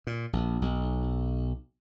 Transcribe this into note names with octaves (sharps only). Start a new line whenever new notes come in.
A#2
A#1
B1